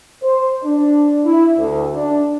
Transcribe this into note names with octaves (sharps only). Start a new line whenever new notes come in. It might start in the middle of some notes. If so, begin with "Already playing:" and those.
C5
D4
E4
D2
D4